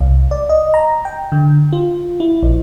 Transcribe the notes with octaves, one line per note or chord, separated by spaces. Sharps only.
C2
D5
D#5
A#5
G5
D3
F4
E4
A#1